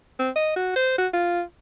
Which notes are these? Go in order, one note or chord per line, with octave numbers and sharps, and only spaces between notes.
C4
D#5
F#4
C5
F#4
F4